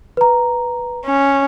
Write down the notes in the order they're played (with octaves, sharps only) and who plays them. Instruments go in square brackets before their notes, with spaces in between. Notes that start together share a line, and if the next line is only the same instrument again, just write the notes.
[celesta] B4 A#5
[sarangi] C#4